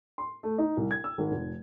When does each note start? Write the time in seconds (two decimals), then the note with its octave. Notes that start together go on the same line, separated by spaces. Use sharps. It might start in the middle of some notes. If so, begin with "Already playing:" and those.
0.18 C6
0.43 A3
0.58 D#4
0.77 C2
0.91 G#6
1.04 E6
1.18 G#1
1.31 F1